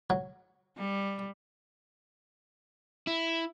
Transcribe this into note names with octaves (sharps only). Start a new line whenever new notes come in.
F#3
G3
E4